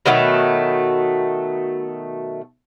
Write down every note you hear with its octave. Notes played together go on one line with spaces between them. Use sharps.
B2 D#3 F#3 A3